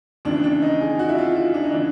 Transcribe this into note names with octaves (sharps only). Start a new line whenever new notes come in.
D#2 C#3 E3 D4
D4
D#4
G#4
F#4
E4
F4
F4
D4
D#4
C#3 E3 D4